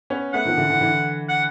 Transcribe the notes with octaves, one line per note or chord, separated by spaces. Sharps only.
B3 C#4
A3 B3 F#5
D#3 F3
D3 E3
D3 E3
D3 E3
F#5